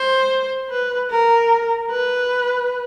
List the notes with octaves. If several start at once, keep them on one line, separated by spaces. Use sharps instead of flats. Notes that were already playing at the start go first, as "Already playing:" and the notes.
Already playing: C5
B4
A#4
B4